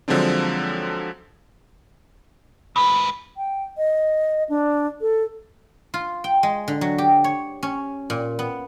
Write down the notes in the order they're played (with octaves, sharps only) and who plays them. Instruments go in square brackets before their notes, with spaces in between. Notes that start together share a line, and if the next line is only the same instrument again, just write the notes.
[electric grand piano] D3 F3 F#3 G#3 C4 D4
[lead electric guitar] G#2 B4 [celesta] B5
[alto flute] G5
D#5
D4
A4
[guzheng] F4
G5
G#3
D3
F#3
G4
C#5
C#4
A#2
B3